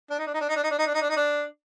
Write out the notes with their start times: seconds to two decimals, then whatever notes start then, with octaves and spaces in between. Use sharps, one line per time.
0.10 D4
0.19 D#4
0.27 D4
0.34 D#4
0.41 D4
0.49 D#4
0.56 D4
0.63 D#4
0.71 D4
0.79 D#4
0.86 D4
0.94 D#4
1.02 D4
1.10 D#4
1.17 D4